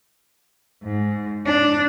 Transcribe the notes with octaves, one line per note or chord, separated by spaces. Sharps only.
G#2
D4